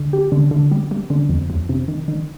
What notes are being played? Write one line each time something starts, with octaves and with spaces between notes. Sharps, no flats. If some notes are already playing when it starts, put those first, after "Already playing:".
Already playing: D3
G4
D3
D3
G3
G3
D3
F2
F2
C3
D#3
D#3